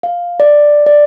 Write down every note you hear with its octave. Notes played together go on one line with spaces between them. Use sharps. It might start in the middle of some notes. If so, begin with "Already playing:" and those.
F5
D5
D5